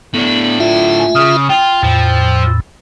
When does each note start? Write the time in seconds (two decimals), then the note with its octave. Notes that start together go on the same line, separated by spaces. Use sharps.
0.14 A2 B3 D4
0.60 F4 E5
1.00 G#5
1.15 C#3 D#6 F6
1.49 F4 G5
1.83 E2 A2 F3